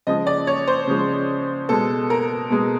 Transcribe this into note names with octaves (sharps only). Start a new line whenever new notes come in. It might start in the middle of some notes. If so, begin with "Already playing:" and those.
C#3 F3 G#3 D#5
D5
C#5
C5
C#3 F3 G#3
B2 G#3 A4
A#4
B2 G#3